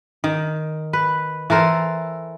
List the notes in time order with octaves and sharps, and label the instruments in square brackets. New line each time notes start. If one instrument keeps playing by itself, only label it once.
[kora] D#3
B4
E3 A4 A#4 C5